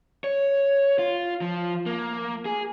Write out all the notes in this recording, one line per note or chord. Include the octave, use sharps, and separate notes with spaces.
C#5
F4
F3
A#3
G#4